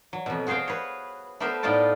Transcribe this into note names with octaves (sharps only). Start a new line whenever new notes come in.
F#3
F2 B2
F#4 G#4 C5 F5 G5
B4 C#5
A3 B3 G4 A#4 C5 E5
A2 B3 D#4 F4 D5 A5